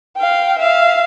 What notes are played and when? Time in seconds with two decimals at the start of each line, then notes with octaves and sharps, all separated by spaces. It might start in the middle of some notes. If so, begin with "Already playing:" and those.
0.17 F5 G5
0.59 E5 F5